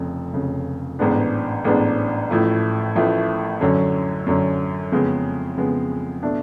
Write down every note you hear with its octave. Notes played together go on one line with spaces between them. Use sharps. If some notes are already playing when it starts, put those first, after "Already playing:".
Already playing: F1 F2 C#3
F1 F2 C#3
A1 G#2 G#3 B3 D4
A1 G#2 G#3 B3 D4
A1 A2 F3 A3
A1 A2 F3 A3
F#2 D3 F#3 C#4
F#2 D3 F#3 C#4
F2 C#3 G#3 B3
F2 C#3 G#3 B3
B2 A3 D4